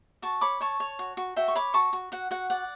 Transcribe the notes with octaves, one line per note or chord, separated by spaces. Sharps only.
F#4 A5 C#6
C#5 B5 D6
C#5 A5 C#6
C#5
F#4
F#4
F#4 E5 G5
C#6
C#5 B5 D6
F#4 A5 C#6
F#4
F#4 F#5
F#4 F#5
D5 F#5